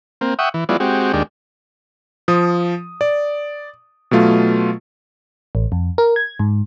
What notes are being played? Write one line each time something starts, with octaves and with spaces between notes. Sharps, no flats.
A#3 C4
E5 F#5 G5 C#6 D#6
E3
F#3 G#3 B3 E4 F4 D5
G#3 C4 F#4 G4
D#2 G#3 D4 G4
F3 D#6
D5
B2 F#3 A3 F4
A1
F2
A#4
G#6
G#2